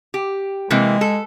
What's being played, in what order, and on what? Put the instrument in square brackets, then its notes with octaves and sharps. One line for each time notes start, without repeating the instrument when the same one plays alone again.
[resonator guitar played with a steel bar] G4
[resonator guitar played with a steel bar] C3 E3 A#3 [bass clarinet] G#3
[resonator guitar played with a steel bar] A4